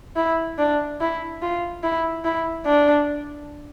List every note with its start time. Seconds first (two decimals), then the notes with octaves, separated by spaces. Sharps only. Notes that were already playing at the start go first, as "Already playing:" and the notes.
0.16 E4
0.58 D4
1.01 E4
1.42 F4
1.83 E4
2.24 E4
2.66 D4